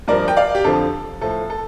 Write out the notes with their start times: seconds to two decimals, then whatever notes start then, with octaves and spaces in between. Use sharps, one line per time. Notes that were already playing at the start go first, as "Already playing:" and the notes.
0.08 G2 F3 A#4 D5
0.28 G5
0.36 D5 F5
0.55 G4
0.64 F2 D3 F3 A4
1.21 A2 F3 A4
1.50 A4